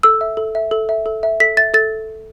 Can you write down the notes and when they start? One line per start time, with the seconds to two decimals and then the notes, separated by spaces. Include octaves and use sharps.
0.03 A4 E6
0.21 E5
0.37 A4
0.55 E5
0.71 A4
0.89 E5
1.06 A4
1.23 E5
1.40 A4 B6
1.57 E5 A6
1.74 A4 A6